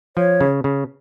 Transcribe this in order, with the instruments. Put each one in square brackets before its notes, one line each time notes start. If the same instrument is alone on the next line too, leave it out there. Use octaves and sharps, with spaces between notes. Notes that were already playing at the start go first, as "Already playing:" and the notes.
[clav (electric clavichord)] F3 [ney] C#5
[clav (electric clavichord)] C#3
C#3